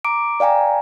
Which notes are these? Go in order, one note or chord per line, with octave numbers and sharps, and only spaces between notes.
A#5 D6 D7
D5 F5 G5 G#5 A#5